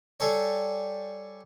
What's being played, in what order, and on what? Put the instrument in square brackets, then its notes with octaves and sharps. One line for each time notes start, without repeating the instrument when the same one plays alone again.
[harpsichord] G3 G#4 A4 C#5